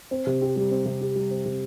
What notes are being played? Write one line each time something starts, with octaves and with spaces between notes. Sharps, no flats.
C4
C3
G4
G3
C4
C3
G4
G3
C4
C3